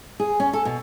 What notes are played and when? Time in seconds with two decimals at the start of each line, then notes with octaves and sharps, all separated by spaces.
0.20 G#4
0.40 C#4
0.53 A4
0.65 B2